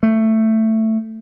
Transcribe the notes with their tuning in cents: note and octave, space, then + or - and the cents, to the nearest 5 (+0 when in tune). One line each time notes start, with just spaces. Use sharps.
A3 +10